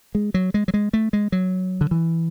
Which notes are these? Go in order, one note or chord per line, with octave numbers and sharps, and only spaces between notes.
G#3
F#3
G#3
F#3
G#3
A3
G#3
F#3
D3
E3